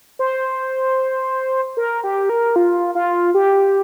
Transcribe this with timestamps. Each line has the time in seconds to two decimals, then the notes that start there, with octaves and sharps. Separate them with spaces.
0.19 C5
1.77 A#4
2.04 G4
2.29 A#4
2.56 F4
2.95 F4
3.34 G4